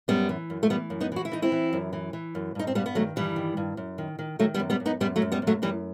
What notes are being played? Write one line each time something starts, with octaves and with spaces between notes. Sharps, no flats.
F#2 G3 B3
E3
F#2
A3
E3 G3 B3
F#2
B3 D#4
E3 F#4
E4
E3 D#4
C4 E4
E3
F#2
E3
E3
F#2
G2 D#4
C4
G2 G3 B3
B3
D#3 F#3 A3
G2 E3 G3
D#3
G2
F#2
D#3
D#3
D#3 F#3 A3
G3 B3
F#2
G3 B3
F#2
B3 D#4
F#2 G3 B3
F#3 A3
F#2
G3 B3
F#2
F#3 A3
F#2 E3 G3